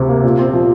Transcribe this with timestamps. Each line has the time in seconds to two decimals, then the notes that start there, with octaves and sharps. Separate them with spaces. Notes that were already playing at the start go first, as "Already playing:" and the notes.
Already playing: D2 C3
0.09 A#3
0.24 A#2
0.39 C4
0.53 F3